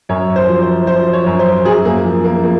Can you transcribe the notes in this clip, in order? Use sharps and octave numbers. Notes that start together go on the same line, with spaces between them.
F#2 C#5
C5
F3
C5
F3 C5
C#5
F#2
C5
F#2 G#4
A#3
F3
A#3
F3 A#3